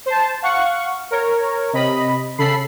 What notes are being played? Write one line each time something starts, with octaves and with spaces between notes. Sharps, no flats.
C5 A5
F5 F#5 C#6
A#4 C#5
C3 D#5 B5
C#3 A4 B5 C7